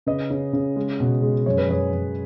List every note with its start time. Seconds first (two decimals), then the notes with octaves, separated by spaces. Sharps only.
0.06 C#3 B4 D#5
0.31 C#3
0.53 C#3
0.76 G#3
1.00 B2
1.22 G#3
1.46 F#2 C#5
1.58 B4
1.68 F#2 G#4 C#5
1.93 F#2